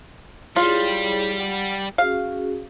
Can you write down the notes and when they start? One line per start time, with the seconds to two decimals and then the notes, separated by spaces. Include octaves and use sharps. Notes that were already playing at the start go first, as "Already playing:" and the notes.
0.56 G3 E4 F4 G#4 C#5
1.37 F#5 G5
1.98 C#4 F#4 G#4 F5